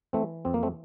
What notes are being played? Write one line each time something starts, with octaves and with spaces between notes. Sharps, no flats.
E3 A3 C4
F2 C4
A#3
A3 C4